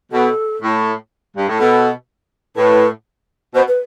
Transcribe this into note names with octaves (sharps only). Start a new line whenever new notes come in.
B2 A4
A2
G2
A2
B2 A4
A2 B4
B2 C5
B4